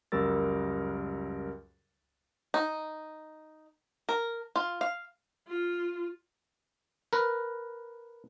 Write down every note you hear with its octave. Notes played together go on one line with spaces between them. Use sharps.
C#2 F#2 G3 A#4 E6 A6
D#4
A#4
F4
F5
F4
A#4 B4